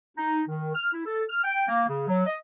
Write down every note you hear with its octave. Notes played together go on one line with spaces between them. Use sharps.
D#4
D#3
F6
E4
A4
F6
G5
A#3
C#3
F#3
D#5